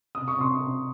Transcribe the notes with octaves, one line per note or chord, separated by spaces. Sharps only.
C3 D#6
C#6
C3 C6 D#6
C3